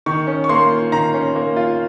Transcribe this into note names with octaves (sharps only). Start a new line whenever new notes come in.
D#3 C#6
C#4
C#6
A#3 C6
F4
D#3 A#5
C#4
A#3
F4